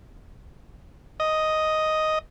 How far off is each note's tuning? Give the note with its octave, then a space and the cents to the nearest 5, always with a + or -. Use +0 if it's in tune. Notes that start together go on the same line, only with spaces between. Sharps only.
D#5 +5